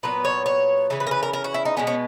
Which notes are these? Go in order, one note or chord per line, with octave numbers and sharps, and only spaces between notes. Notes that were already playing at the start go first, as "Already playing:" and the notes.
A#2 F#3 B3 B4
C#5
C#5
C#3 E3 C#4 B4
B4
A#4
B4
A#4
A#4
F#4
E4
D#4
B2 G#3 B3 C#4
C#4